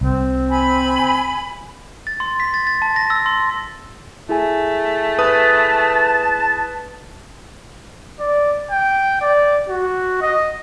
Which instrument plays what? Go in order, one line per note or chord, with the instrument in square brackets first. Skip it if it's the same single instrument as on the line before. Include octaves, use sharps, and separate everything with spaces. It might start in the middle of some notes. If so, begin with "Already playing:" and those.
[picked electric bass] C2 [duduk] C4
[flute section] G#5 B5
[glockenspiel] A6
C6
B6
A6
A6
A5
A#6
E6
C6
[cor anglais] A3 [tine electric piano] E4 G#4 G#5
[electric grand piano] B4 D#6 [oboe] A5
[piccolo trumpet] D5
G5
D5
F#4
D#5